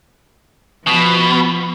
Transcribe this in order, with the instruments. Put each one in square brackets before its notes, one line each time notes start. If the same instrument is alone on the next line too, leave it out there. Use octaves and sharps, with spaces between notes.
[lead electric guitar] B2 [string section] F3